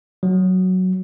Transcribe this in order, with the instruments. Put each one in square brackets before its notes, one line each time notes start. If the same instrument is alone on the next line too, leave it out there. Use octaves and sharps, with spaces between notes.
[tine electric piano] F#3